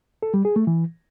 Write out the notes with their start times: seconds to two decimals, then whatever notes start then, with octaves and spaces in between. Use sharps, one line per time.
0.23 A4
0.34 G3
0.45 G#4
0.56 A3
0.67 E3